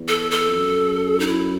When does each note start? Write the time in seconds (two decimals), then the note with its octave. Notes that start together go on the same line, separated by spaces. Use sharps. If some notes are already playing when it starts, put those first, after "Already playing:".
Already playing: E2
0.08 A4
0.31 A4
0.49 F2
0.56 F#2
1.20 D#4
1.27 E4